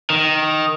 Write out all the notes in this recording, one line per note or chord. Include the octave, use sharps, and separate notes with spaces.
D#3